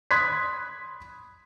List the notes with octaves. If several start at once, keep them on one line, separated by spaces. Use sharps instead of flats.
B5 C6 D#6 F#6 G#6 B6